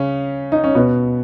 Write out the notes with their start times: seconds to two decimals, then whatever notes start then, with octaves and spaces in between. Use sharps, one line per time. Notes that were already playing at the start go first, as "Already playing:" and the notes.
Already playing: C#3 C#4
0.52 D#4
0.64 C#4
0.75 B2 B3